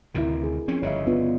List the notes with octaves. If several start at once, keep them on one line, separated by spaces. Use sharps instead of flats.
D2 C3 D#3 E4 A#4
G#4
F3 C4 C#4
G1 C#3 C#5 D#5 E5
B3 D4 F4